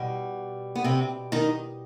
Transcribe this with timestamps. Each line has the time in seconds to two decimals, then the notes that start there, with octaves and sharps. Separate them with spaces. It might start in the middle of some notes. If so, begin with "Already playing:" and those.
Already playing: B2 G3
0.75 B3
0.84 C3 C4
1.32 D#3 D#4